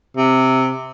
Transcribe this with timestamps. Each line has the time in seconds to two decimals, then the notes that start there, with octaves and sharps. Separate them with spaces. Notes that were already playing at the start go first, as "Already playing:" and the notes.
0.17 C3